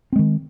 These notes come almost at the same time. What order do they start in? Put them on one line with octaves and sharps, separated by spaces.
C4 G#3 D#3